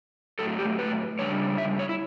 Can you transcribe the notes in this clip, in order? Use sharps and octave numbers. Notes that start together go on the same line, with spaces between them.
A2 F#3 A3 A4
G4
B4
C#3 G3 D4 C#5
E5
C#5
E4